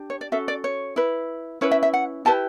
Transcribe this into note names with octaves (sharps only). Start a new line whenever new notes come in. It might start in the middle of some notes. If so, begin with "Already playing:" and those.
Already playing: D4 G4
C#5
D5
C#4 F#4 A4 E5
D5
C#5
E4 B4
C#4 E4 B4 C#5
E5
E5
F#5
E4 G4 B4 A5